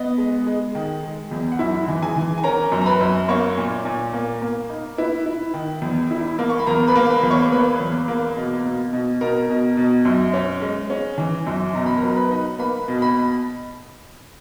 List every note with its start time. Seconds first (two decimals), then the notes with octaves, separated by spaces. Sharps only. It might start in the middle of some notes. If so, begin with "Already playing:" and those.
Already playing: B3 D#5
0.18 G#3
0.47 G#3
0.75 D#3
1.03 G#3
1.31 E2
1.52 F#5
1.59 F#2 E4 E5
1.88 E3
2.02 G#4 G#5
2.16 E3
2.38 G#5
2.44 C#4 A#4 A#5
2.72 F#2
2.82 A#5
2.86 B4 B5
3.01 F#2
3.29 A#3 C#5 C#6
3.58 A#2
3.85 A#2
4.13 A#3
4.42 A#3
4.69 D#4
4.98 E4 B4 B5
5.26 E4
5.54 D#3
5.82 E2
6.11 E4
6.39 A#3
6.50 C#6
6.59 B5
6.67 E2 A#4 A#5
6.88 B4 B5
6.95 A#3
7.10 B4 B5
7.23 E2
7.30 C#5 C#6
7.52 A#3 B4 B5
7.80 E2
8.08 A#3
8.37 B2
8.64 B2
8.93 B2
9.21 B2 A#4 A#5
9.50 B2
9.77 B2
10.05 F#2
10.33 C#4
10.62 G#3
10.90 C#4
11.18 E3
11.47 F#2
11.74 B2 A#5
11.86 B5
11.97 A#4 A#5
12.03 F#3
12.16 B4 B5
12.31 D#4
12.59 A#3 B4 B5
12.88 B2
13.02 B5